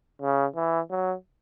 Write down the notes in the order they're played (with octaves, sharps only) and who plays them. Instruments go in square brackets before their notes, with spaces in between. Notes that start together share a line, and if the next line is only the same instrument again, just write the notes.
[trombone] C#3
E3
F#3